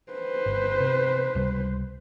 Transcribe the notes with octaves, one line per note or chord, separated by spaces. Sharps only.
B4 C5
G1
C3
C#2 C3 G3